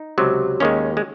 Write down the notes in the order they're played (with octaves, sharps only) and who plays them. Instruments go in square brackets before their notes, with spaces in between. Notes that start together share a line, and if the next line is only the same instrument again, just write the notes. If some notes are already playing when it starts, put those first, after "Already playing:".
Already playing: [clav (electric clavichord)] D#4
C#2 C3 F#3
D#2 D#3 G#3 C#4
G#3